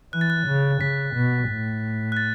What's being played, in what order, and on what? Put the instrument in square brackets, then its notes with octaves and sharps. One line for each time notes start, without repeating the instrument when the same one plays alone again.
[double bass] E3 [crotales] F#6
[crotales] A6
F#6
[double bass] C#3
[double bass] C#3 [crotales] B6
[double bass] B2
A2
[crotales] F#6
A6